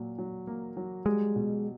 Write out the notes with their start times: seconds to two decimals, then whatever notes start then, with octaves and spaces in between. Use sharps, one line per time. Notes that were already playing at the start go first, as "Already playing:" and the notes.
Already playing: A#2 F#3
0.19 F#3
0.47 A#3
0.77 F#3
1.06 G3 G#3
1.36 B2